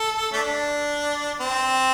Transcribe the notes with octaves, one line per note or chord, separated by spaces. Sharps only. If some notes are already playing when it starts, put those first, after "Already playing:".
Already playing: A4
A3 D4
C4